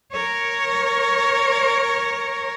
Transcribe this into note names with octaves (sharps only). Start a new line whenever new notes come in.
A#4 C#5